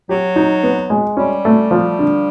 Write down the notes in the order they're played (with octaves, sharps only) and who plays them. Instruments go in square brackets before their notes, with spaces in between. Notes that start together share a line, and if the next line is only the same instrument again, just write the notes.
[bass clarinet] F#3 [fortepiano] G4
[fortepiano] D#4
B3
G#3
[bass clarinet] G3 [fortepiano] C#4
[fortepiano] A3
F3
D3